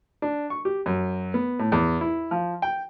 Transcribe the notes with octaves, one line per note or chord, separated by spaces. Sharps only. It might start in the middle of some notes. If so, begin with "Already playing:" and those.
D4
C#6
G4
F#2
B3
A2
E2
E4
F3
G5